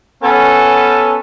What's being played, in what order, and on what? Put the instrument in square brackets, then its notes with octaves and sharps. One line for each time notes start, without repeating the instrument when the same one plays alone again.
[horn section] B3 C#4 A4